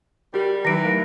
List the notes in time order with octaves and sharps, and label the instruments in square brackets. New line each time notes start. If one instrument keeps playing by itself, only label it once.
[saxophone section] G3 [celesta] F#4 G4 [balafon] A#4
[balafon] D#3 F#3 D#4 [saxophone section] E3 [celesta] A#6 D7
[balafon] A3 A#4